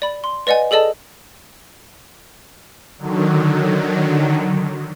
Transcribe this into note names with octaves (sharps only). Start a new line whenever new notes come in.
D5 B5
C6
B4 D5 D#5 F#5 G#5
G#4 A4 D5 D#5 A5
D3 D#3 F#3